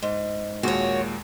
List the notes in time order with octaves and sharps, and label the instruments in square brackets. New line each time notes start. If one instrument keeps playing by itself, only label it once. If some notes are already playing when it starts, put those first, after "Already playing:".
[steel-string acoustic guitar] G#2
[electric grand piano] D#2 A#2 G#3 [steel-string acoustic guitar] F#4 C#5